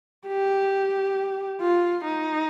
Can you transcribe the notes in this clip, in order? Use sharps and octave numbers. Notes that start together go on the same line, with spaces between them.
G4
F4
D#4